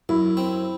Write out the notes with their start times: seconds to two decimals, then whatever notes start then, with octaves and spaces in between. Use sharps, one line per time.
0.09 F#2 E4
0.37 C4